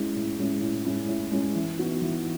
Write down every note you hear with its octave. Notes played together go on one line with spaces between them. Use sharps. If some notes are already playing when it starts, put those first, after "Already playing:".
Already playing: G#3 C#4 E4
A2
G#3 C#4 E4
A2
G#3 C#4 E4
A2
G#3 C#4 E4
E3
B3 D#4 F#4
E3